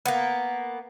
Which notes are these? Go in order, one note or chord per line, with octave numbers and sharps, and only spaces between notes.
A#3 B3